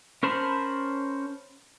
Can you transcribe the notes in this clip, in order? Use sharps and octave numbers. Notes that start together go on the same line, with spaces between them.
C#4 A#4 C5 A5 B5